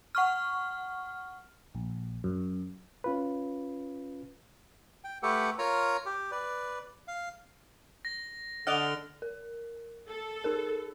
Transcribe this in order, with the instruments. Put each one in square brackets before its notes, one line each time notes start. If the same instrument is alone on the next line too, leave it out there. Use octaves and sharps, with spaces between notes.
[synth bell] F#5 C#6 F6
[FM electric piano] A#1
F#2
[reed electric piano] C#4 F4 B4
[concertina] G5
A3 G4 A4 B4 F#5
F4 A#4 C#5 A#5
G4
B4 D5
F5
[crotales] A#6
[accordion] D3 [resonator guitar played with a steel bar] D5 D#5 F#5 [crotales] F6 F7 G7
[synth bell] A#4
[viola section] A4
[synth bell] D#4 G#4 A#4